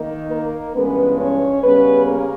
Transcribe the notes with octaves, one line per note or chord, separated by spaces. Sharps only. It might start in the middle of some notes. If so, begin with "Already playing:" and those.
Already playing: D#3 A#3 D#4
A#3 A#4
G2 E3 G#3 B3 C#4 B4
C#4 C#5
C#3 G3 B3 C#4 B4
A#3 A#4